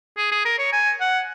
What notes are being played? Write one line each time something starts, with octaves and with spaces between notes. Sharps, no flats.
G#4
G#4
A#4
C#5
G#5
F#5